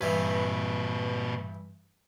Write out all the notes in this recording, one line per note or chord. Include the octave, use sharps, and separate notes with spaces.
G2 A#2 E3 B4